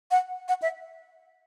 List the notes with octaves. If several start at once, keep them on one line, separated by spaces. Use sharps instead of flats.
F#5
F#5
E5